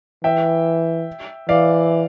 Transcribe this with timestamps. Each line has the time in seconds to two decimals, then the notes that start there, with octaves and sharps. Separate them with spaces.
0.24 E3 E5 G5
1.49 E3 D5 F5